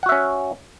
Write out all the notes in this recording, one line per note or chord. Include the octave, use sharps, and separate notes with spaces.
C#4 F#4 E5 F#5